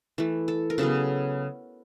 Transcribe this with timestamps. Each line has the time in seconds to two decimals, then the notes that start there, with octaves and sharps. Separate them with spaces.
0.18 E3 A3
0.48 A4
0.70 A#4
0.78 C#3 F#3 B3 A4